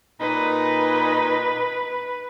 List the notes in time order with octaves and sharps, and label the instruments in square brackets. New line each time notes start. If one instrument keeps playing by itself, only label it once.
[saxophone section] A#2 D#4 [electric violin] B4